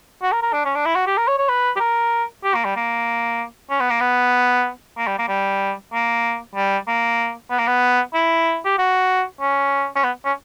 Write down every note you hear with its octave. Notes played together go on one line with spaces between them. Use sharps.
F#4
A#4
A#4
D4
C#4
D4
E4
F#4
G4
A#4
C#5
C#5
B4
G4
A#4
G4
A#3
G3
A#3
C#4
B3
A#3
B3
A#3
G3
A#3
G3
A#3
G3
A#3
B3
A#3
B3
E4
G4
F#4
C#4
C#4
B3
C#4